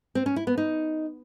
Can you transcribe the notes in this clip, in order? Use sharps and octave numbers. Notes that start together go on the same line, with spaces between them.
C4
C#4
E4
B3
D#4